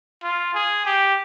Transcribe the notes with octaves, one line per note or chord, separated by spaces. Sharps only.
F4
G#4
G4